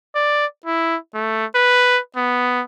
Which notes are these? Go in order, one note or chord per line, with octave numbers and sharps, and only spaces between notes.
D5
E4
A3
B4
B3